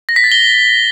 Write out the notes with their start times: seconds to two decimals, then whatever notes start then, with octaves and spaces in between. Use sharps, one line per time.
0.09 A#6
0.16 B6
0.24 A6
0.32 G7